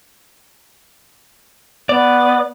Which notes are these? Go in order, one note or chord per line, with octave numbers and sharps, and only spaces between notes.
B3 D5